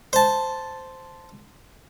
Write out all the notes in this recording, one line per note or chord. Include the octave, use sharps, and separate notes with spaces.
C5 A5